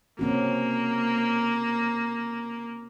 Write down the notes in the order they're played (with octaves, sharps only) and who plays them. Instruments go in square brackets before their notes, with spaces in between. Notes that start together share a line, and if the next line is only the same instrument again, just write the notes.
[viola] A#3 [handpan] C4 C#4 F#4